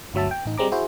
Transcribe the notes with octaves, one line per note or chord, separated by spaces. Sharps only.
G1 D2 F#3 E5 A5
G5
A1 D#4
G3 G#3 C4 A#5 D6
E4 F#4 G#4 C5